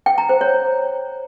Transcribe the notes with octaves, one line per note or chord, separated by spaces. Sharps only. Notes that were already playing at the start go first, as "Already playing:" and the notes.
G5
A#5
C5
C#5